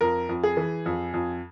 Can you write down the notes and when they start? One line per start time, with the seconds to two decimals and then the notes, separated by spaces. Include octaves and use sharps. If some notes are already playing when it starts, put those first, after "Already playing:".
0.01 F2 A#4
0.29 F2
0.43 G#4
0.57 E3
0.86 F2
1.14 F2